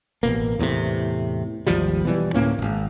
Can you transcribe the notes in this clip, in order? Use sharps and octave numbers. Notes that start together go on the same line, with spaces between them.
A1 B2 A#3
E2 A2 C3
G#1 D#2 F3 G3
B2 E3 G3
D2 A2 A#3 C#4
D#1 G#1